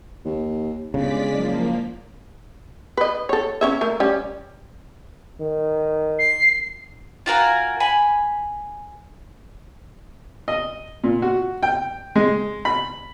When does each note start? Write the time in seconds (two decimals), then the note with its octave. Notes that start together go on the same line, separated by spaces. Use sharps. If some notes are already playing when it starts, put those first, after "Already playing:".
0.25 D#2
0.94 G1 C#3 G#3 D5 B6
1.33 F#1 F3 A#3
2.97 B4 D#5
3.29 A4 C#5
3.61 C#4 C#5 E5
3.81 A3 A#4
4.00 G3 C#4
5.41 D#3
6.19 C7
7.26 F4 F#4 A#4 G#5
7.80 G#5 B5
10.48 D#5
11.04 A#2
11.22 F#4
11.63 G5
12.16 G#3
12.65 B5